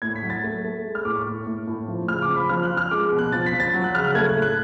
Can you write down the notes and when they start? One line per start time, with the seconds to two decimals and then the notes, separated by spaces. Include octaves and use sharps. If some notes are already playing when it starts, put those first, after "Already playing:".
0.02 A2 G#6
0.16 B6
0.23 F#3
0.30 A6
0.44 A3
0.64 A3
0.85 G#3
0.95 F6
1.05 A2 D6
1.15 C#6
1.26 A2
1.46 A2
1.67 A2
1.88 F3
2.08 C#3 F6
2.22 D6
2.29 F3
2.36 B5
2.49 F3 F6
2.63 F#6
2.71 F3
2.77 F6
2.91 G#3 D6
3.12 B2
3.19 F#6
3.32 F3 A6
3.46 B6
3.53 F3
3.60 A6
3.74 F#3
3.84 F#6
3.94 C#3 F6
4.04 F#6
4.15 A3 G#6
4.29 F#6
4.35 A2
4.42 F#6